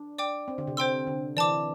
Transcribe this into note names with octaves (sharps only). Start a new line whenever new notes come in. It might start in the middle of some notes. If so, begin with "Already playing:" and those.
Already playing: D4
D5 G5 D6
C4
D3
C3
C5 G5 C6 E6
D3
E3 D5 A5 D6